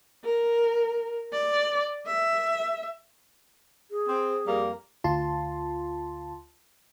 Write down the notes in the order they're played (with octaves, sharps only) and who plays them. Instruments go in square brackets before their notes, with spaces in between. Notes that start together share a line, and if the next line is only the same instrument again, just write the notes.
[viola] A#4
D5
E5
[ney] G#4
[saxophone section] C4
F2 G3 A#3
[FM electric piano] D2 F4 A5 C6